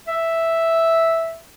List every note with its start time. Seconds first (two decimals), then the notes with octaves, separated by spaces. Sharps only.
0.08 E5